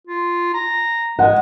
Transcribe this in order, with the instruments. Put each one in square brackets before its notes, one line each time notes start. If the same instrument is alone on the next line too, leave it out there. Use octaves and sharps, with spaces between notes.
[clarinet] F4
A#5
[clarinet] G#3 [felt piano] F#5